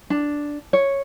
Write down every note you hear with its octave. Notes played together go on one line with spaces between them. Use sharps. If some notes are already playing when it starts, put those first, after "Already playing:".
D4
C#5